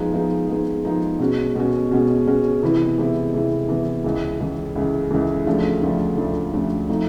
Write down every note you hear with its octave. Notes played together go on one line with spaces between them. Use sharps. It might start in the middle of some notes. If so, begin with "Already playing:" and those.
Already playing: F3 G#3 B3 D#4 G#4
F3 G#3 B3 D#4 G#4
F3 G#3 B3 D#4 G#4
F3 G#3 B3 D#4 G#4
B2 G#3 C#4 F#4
B2 G#3 C#4 F#4
B2 G#3 C#4 F#4
B2 G#3 C#4 F#4
C3 E3 G#3 B3 E4
C3 E3 G#3 B3 E4
C3 E3 G#3 B3 E4
C3 E3 G#3 B3 E4
C#2 C#3 E3
C#2 C#3 E3
C#2 C#3 E3
C#2 C#3 E3
D2 C#3 F3 A3 D4
D2 C#3 F3 A3 D4
D2 C#3 F3 A3 D4
D2 C#3 F3 A3 D4
F3 A3 C4 D#4